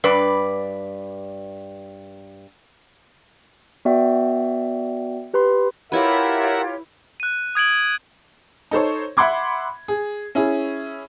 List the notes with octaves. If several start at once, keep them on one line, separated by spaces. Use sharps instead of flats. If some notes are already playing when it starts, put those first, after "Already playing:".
G2 B4 D5
B3 F#4 D5 E5 G5
G4 B4 B5 C6
E4 F4 G4 A#4 B4 C#5 E5 F#5
F#6 D#7
D#6 G#6 D7 F#7
D#4 A4 C5 C#5
E5 F#5 B5 C6 D6 G#6
G#4
C#4 E4 G#4